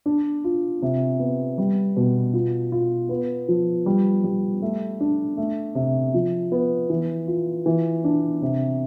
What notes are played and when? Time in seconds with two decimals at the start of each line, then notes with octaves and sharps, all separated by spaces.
0.06 D4
0.44 F4
0.82 C3
1.19 B3
1.58 G3
1.97 B2
2.33 F4
2.72 F4
3.09 B3
3.48 F3
3.86 G3
4.24 G3
4.62 A3
5.00 D4
5.37 A3
5.75 C3
6.14 F3
6.52 B3
6.90 E3
7.27 F4
7.66 E3
8.04 D4
8.42 C3